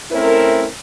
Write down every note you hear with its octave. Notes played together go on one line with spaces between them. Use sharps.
A3 C4 C#4 E4 A#4